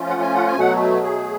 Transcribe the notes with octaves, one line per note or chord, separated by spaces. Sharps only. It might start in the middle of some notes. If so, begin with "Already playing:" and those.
Already playing: F3 A3 C#4 F4
F#5
G#5
F#5
G#5
B2 F#3 A3 F#5
G#4